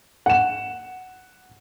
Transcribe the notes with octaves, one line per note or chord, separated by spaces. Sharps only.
F#5 E7